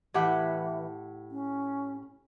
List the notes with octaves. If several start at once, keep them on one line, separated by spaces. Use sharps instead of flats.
A2 E3 G4 F#5
C#4